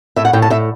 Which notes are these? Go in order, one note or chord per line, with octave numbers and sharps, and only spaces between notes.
A2 E5
F#5
A2 G5
A5
A2 E5